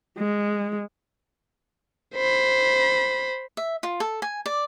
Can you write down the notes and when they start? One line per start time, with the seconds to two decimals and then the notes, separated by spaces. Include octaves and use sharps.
0.18 G#3
2.16 C5 B5
3.57 E5
3.83 F4
4.00 A4
4.22 G#5
4.46 D5